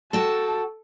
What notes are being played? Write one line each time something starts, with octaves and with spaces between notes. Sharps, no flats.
F#4 A4 G5 A5